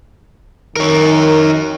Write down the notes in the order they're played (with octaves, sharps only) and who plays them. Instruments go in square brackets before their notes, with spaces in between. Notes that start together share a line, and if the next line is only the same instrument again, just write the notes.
[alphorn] D#3 [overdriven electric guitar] A#4 C#5